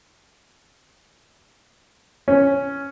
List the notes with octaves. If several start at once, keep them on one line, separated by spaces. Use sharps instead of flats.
C#4